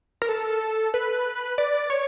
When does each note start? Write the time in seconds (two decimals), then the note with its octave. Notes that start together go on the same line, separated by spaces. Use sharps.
0.22 A#4
0.29 A4
0.94 B4
1.58 D5
1.90 C#5